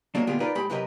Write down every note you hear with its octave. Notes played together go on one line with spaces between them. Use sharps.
F#3 G#3 A#3 D4
A#2 D3 G#3 B3 F4 G4
D#4 F4 G#4 A#4 B4 D5
A2 G#3 G4 B5
F#2 C3 G4 A#4 B4 D#5